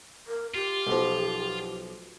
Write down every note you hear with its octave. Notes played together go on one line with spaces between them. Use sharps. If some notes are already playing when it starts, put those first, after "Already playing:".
A#4
F4 G4
B1 F3